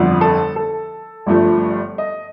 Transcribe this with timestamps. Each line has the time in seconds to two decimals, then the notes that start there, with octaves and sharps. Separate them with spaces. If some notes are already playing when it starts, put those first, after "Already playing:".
Already playing: G1 F2 D3
0.21 A4
0.56 A4
1.26 G1 G2 F3 A3
1.98 D#5